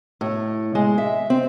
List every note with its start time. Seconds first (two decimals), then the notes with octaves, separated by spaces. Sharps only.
0.21 A2
0.75 G#3
0.98 E5
1.30 C4